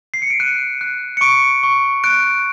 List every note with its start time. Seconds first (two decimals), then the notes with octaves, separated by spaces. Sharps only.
0.14 C7
0.22 C#7
0.30 D7
0.40 F#6 D#7
0.81 F#6
1.17 C#7
1.21 C#6 D7
1.63 C#6
2.04 F#6 D7